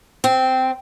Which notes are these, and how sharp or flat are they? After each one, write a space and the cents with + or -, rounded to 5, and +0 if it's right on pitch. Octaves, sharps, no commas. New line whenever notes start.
C4 -10